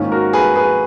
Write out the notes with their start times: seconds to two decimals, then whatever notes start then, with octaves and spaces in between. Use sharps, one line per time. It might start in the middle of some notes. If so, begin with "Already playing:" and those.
Already playing: G#2 D#3 A#3 C#4 F4
0.12 F#4 A#4
0.33 G#4 B4
0.56 G#4 B4